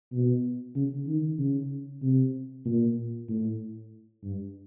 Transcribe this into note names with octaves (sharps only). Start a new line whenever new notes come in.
B2
C#3
D#3
C#3
C3
A#2
A2
G2